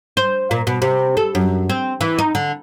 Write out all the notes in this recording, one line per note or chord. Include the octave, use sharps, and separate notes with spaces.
C5
A#2
B2
C3
A4
F#2
C4
E3
D#4
D3